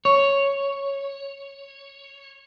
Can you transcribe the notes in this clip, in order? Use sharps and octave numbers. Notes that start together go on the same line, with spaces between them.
C#5 C#6